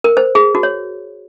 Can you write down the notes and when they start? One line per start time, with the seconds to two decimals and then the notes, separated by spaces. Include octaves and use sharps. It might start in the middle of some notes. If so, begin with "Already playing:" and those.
0.04 A#4
0.17 C5
0.35 G#4
0.55 F#4
0.63 C#5